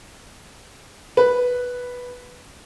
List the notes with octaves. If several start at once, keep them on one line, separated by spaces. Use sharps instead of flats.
B4